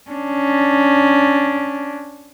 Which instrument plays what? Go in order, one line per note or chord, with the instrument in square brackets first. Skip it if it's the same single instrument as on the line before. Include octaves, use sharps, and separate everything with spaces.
[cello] C#4 D4